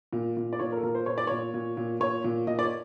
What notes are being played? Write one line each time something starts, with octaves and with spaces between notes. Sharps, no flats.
A#2
A#2
D5
A#2 C#5
A#4
A4
A#2 A#4
C5
A#2 C#5
D5
A#2 C#5
A#2
A#2
A#2 C#5
A#2
A#2 D#5
D5
C#5